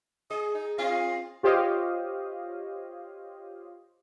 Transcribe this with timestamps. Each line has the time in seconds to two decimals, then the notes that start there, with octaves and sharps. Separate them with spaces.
0.30 G#4 D#5
0.54 D#4
0.78 C4 F4 D#5
1.43 F4 G4 C5 C#5 D#5 F5